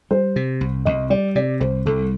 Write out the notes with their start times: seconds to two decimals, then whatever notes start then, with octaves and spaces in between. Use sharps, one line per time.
0.11 G3 C5
0.36 C3
0.61 C2
0.85 C2 D#5
1.10 G3 D5
1.35 C3 D5
1.60 C2 C5
1.86 C2 A4